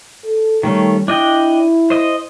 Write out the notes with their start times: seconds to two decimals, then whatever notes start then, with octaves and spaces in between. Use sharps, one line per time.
0.24 A4
0.63 D#3 G3 A3 C#4
1.08 D4 E4 D#5 G5
1.90 C5 D#5